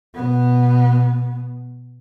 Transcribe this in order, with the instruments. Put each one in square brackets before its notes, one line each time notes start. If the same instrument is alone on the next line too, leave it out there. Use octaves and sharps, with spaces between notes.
[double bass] B2 B3